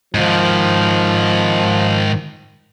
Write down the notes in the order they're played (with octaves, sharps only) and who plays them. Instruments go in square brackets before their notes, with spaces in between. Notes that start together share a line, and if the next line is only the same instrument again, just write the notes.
[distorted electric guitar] G#2 D#3 [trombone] F3